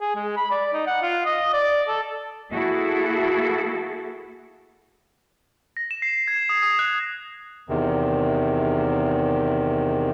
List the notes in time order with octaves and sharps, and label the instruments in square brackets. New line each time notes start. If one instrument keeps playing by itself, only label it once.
[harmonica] G#4
G#3
B5
D5
D#4
F#5
F4
D#5
D5
A4
[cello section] A#3 E4 F#4 G#4 A4
[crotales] A#6
E7
C7
G#6
D#6
D#6
F#6
[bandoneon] E2 C3 D#3